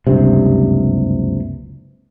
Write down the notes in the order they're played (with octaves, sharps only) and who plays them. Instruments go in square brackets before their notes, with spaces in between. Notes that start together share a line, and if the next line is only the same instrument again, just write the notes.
[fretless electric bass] F#1 C#2 G2 C3